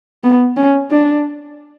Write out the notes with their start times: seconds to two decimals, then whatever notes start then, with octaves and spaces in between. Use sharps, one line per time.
0.24 B3
0.57 C#4
0.91 D4